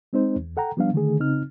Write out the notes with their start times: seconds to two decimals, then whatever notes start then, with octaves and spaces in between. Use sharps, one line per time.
0.13 G#3 C4 D#4 C5
0.36 E2
0.57 A4 F#5 G5 A#5
0.77 F3 G3 B3 D4 F5
0.93 D3 D#3 A3 G#4
1.19 C#3 C4 D#4 F6